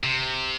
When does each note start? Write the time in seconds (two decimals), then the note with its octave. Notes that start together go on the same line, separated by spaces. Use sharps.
0.04 C3